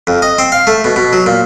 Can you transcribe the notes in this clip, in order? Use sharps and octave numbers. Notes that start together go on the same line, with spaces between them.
F2
D#5
C4
F5
A3
B2
B2
F#3
A#2